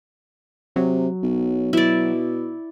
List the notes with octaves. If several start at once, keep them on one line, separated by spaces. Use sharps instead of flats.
C3 F#3
B1
B2 E4 D5